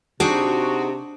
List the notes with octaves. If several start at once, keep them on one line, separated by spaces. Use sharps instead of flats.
C3 D4 D#4 F#4 G#4 G5